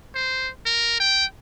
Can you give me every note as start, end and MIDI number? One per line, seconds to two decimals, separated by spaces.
0.15 0.49 72
0.66 0.99 70
1.00 1.25 79